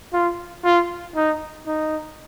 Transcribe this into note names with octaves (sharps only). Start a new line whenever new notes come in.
F4
F4
D#4
D#4